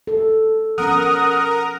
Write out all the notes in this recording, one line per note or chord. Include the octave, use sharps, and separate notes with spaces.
A4
F3 B3 C#4 A#4 F#5 D#6